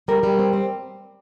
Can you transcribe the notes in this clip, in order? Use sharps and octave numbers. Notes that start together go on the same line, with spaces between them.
G3 A#4
G3
C4
C4